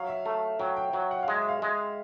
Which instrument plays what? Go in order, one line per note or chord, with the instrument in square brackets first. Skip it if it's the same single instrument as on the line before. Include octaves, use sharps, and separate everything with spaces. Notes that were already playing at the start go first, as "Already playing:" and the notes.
Already playing: [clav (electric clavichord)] F#3 [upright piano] F5
[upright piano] E5
[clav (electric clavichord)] A3
[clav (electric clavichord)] F#3 [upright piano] G5
[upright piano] G5
[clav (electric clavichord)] F#3 [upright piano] F#5
[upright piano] F#5
F5
[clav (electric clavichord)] G#3
[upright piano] E5
F5
[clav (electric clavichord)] G#3